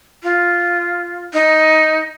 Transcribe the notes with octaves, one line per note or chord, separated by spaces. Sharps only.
F4
D#4